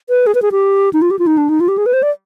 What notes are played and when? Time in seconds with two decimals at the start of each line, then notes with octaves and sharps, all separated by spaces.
0.09 B4
0.27 G#4
0.35 B4
0.42 G#4
0.52 G4
0.93 D#4
1.02 F4
1.11 G4
1.19 F4
1.27 D#4
1.38 D4
1.49 D#4
1.60 F4
1.68 G4
1.78 G#4
1.86 B4
1.93 C5
2.03 D5